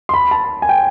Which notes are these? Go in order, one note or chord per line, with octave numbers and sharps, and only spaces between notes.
C6
B5
A5
G#5
G5